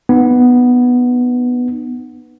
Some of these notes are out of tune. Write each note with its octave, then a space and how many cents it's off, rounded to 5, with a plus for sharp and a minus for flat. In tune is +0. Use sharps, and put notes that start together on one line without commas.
B3 +0 D#4 -35